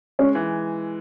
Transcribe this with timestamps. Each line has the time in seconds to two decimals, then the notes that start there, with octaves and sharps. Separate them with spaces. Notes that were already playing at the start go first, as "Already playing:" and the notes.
0.19 G#3 C#4
0.35 E3